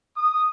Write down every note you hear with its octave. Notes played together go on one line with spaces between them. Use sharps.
D#6